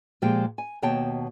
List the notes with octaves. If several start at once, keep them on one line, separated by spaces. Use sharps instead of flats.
A#2 F3 G#3 G4 G5
G#5
D#2 B2 C#5 G5 A5